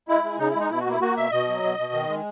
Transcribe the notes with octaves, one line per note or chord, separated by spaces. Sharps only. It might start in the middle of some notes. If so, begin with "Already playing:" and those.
G#3 E4
G#3
C#3 D#4
E4
G#3
D#4
B2 E4
F#4
A#3 E4
A#3 F#4
B2 E5
B2 D#5
F#3
B2
B2
D#3
G#3